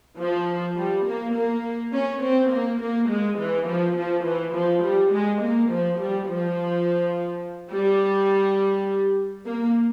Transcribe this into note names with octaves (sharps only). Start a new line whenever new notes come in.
F3
G3
A#3
A#3
C#4
C4
A#3
A#3
G#3
E3
F3
F3
E3
F3
G3
G#3
A#3
F3
G3
F3
G3
A#3